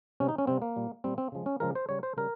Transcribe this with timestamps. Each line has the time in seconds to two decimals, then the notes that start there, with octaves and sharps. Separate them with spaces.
0.20 C3 G3 C#4
0.29 D#4
0.38 C#4
0.47 C3 G3 C4
0.62 A#3
0.76 A#2 G3
1.04 A#2 G3 C4
1.18 C4
1.32 C#3 F3 G#3
1.46 C#4
1.60 C#3 F3 G#3 A#4
1.75 C5
1.89 C#3 G3 C#5
2.03 C5
2.17 C#3 G3 A#4